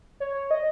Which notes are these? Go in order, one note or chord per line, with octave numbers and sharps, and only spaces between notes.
C#5
D#5